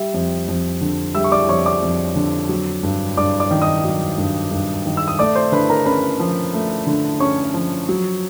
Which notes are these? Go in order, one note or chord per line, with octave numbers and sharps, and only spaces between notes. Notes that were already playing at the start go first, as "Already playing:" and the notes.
Already playing: G3 E5
F2
F2
D3
G3 E5 E6
C#6
D5 D6
F2 C#5 C#6
D5 D6
F2
D3
F#3
G2
G2 D5 D6
D5 D6
D#3
D#5 D#6
F#3
G2
G2
D#3
E6
D#6
A3 D5 D6
C5 C6
D3 B4 B5
A#4 A#5
C#4 B4 B5
F3
A3
D3
C#4 C#5 C#6
F3
F#3